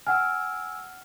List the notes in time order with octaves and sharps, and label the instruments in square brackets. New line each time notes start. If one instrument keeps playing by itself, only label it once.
[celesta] F#5 F6 [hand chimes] G#5 E6